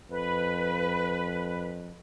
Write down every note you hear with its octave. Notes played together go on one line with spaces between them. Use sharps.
F2 B4